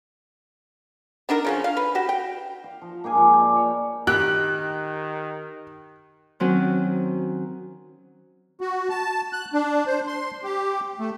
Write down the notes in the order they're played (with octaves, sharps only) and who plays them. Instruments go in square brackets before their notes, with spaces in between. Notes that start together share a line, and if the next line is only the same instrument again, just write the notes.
[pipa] B3 D4 D#4 A#4
C#3 F3 C#4
F5
B4
F#4 G4
G5
[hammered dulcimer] F5
F3
A#3 G4 G#4 G#5
G#2 F3
G4 D5
C#5
[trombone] D#3 [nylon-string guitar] G4 [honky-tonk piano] F#6
[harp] D#3 F#3 C4 C#4 F#4
[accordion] F#4
A5
F#6
D4
C5
C6
G4
A3